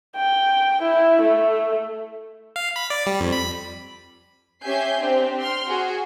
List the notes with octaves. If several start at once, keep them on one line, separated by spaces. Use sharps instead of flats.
G5
E4
A3
F5
B5
D5
G3
F2
B5
C#4 G4 E5 G#5 G6 C7
C4 D4 G4
G5 C6 F6
F#4 G#4